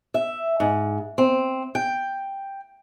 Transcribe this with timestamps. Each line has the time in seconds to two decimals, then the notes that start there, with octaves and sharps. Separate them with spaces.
0.14 E5
0.60 G#2
1.18 C4
1.75 G5